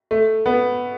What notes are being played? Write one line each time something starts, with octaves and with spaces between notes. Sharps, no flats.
A3
B3